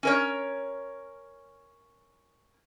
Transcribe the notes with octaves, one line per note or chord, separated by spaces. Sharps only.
C#4 A#4 C#5